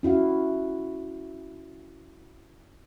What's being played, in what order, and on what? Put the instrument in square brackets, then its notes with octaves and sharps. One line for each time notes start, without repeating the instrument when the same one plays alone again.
[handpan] C#4 E4 F#4 F5